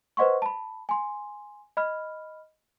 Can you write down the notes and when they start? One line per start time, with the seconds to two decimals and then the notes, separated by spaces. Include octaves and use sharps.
0.17 B4 C5 D#5 F#5 C6 C#6
0.42 A5 B5
0.89 G#5 C6
1.77 D#5 B5 F6